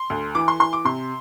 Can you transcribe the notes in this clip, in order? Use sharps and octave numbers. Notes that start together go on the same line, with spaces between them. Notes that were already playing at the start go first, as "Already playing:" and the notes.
Already playing: C6
D2
E3 D6
C6
E3 C6
D6
C3 C6